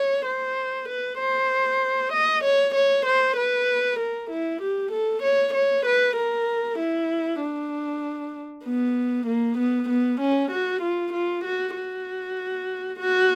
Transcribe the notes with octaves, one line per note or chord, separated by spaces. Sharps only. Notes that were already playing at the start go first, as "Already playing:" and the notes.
Already playing: C#5
C5
B4
C5
D#5
C#5
C#5
C5
B4
A#4
E4
G4
A4
C#5
C#5
B4
A#4
E4
D4
B3
A#3
B3
B3
C#4
F#4
F4
F4
F#4
F#4
F#4